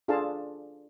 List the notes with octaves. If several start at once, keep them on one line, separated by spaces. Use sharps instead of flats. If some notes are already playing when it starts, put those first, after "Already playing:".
D4 F4 G#4 A4 F5 A5